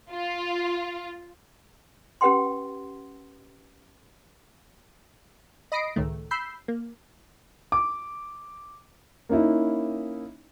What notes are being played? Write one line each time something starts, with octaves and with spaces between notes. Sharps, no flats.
F4
C#4 G4 B4 F#5 G5 C6
D#5 B5 D#6 A#6 C7 D7
C#2 A2 D#3 A3
B5 E6 G6 C7
A#3
D6
A#3 C#4 D#4 E4